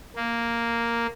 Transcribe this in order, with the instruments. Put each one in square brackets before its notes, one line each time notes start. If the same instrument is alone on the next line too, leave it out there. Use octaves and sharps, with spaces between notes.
[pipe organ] A#3